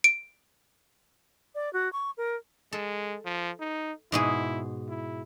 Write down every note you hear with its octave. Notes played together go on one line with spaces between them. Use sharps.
D7
D5
F#4
C#6
A#4
G#3 A4
F3
D#4
G#2 B2 E4 G#4
E4